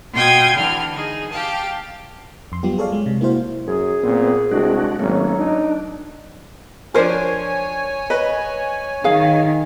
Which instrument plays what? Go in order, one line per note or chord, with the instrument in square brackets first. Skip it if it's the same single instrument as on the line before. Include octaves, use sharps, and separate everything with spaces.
[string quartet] B2 F4 F5 G5 D#6 G#6
D3 E3 F6
D#4 G#4
G4 F5 G5 A5
[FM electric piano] F2 C6
F#3 G3 B3 F4 G4
G#4 A4 C#5 D5 F5
G#3
C3
A#3 E4 F#4 C5 F5
[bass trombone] F#2 [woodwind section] G#4
[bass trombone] A#2 [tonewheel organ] B3 C4
[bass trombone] C2 [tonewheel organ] G#3 D4 F#4
[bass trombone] G#1 [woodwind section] F#3 [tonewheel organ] A3 A#3 C#4
[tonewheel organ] D4 [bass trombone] D#4
[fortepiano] F3 D4 [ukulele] A#4 C5 [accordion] C#5 G#5
[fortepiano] B4 [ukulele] D#5
[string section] D#3 [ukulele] G#4 F5